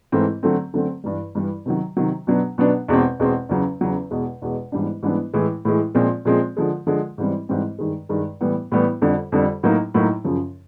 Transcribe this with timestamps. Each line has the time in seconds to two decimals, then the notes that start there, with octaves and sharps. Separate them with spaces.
0.12 G#2 E3 A3 C4
0.43 D3 F#3 A3 C4
0.74 D3 F#3 A3 C4
1.04 G2 E3 G3
1.35 G2 E3 G3
1.66 C3 D#3 F#3
1.97 C3 D#3 F#3
2.27 B2 F#3 B3 D4
2.58 B2 F#3 B3 D4
2.88 E2 B2 G#3 C4
3.19 E2 B2 G#3 C4
3.49 E2 C#3 F#3
3.81 E2 C#3 F#3
4.11 E2 B2 G#3
4.42 E2 B2 G#3
4.72 G#2 E3 G3 B3 D4
5.02 G#2 E3 G3 B3 D4
5.34 A2 E3 G#3
5.65 A2 E3 G#3
5.95 A#2 F3 G#3 C4
6.25 A#2 F3 G#3 C4
6.57 D3 F3 G#3
6.87 D3 F3 G#3
7.18 G#2 E3 G3 C4
7.49 G#2 E3 G3 C4
7.79 G2 D#3 G#3
8.09 G2 D#3 G#3
8.41 A2 E3 G3 B3
8.72 A2 E3 G3 B3
9.02 F2 D3 G3
9.32 F2 D3 G3
9.63 A2 F#3 A#3 D#4
9.94 A2 F#3 A#3 D#4
10.24 F#2 C#3 F3